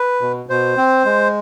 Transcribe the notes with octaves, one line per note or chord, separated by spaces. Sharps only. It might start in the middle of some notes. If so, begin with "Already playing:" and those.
Already playing: B4
B2
B2 C5
C4
G#3